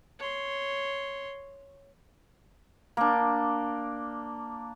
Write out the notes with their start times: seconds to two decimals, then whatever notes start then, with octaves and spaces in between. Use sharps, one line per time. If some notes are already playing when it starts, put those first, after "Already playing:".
0.19 C#5 C6
2.97 A#3 D4